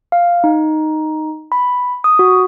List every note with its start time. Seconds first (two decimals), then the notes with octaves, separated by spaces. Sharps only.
0.12 F5
0.44 D#4
1.52 B5
2.04 D#6
2.19 F#4